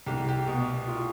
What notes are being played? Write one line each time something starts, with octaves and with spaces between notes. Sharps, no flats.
C2 G4
G4
B2
F4